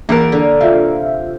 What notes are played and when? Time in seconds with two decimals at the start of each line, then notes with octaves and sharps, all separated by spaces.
0.09 E2 A#3 A#4 F#5 A5
0.32 D3
0.61 C3 F4 E5 F5